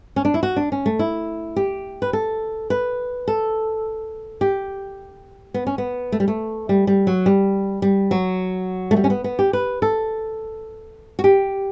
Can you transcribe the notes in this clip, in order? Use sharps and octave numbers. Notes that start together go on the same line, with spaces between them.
C#4
D4
E4
F#4
D4
C#4
A3
E4
G4
B4
A4
B4
A4
G4
B3
C#4
B3
A3
G3
A3
G3
G3
F#3
G3
G3
F#3
A3
G3
C#4
B3
B3
G4
B4
A4
F#4
G4